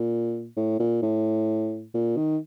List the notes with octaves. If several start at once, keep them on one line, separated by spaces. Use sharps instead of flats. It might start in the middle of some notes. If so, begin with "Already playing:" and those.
Already playing: A#2
A2
A#2
A2
A#2
D#3